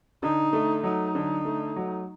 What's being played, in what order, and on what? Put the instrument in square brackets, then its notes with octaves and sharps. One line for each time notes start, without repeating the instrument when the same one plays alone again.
[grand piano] D3 [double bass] D#4
[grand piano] A3
[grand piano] F#3 [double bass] D#4
[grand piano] D3
A3
F#3